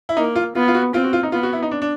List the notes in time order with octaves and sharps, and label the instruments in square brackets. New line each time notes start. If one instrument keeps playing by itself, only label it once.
[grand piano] E4
[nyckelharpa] A#3 [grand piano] D#4
[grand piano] F4
[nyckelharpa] B3 [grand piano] F4
[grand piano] F4
F#4
[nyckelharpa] C4 [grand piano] F4
[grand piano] F#4
F4
D#4
[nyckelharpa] B3 [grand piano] F4
[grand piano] F#4
E4
D#4
D4
D4